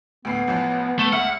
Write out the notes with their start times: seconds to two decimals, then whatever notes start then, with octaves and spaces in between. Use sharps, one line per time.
0.25 D2 A2 B3 C7
0.48 A1 E3 F3
0.99 A3
1.13 C#2 E5 F#5 F6